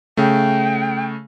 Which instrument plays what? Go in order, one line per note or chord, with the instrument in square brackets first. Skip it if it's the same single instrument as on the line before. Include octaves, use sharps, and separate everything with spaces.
[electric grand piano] C#3 A3 [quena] G5